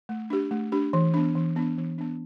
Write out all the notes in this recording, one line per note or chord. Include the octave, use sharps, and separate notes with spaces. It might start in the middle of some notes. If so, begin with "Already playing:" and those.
A3
D4 G4
A3
D4 G4
E3
B3 D4
E3
B3 D4
E3
B3 D4